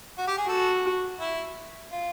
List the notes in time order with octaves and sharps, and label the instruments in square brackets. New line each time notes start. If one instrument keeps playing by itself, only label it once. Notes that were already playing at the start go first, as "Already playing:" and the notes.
[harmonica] F#4
G4
G#4
[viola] F#4 [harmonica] A4
[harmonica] E4
F4